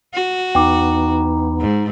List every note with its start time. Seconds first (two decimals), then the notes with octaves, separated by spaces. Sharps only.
0.14 F#4
0.55 E2 B3 D#4 G5 D6
1.60 G#2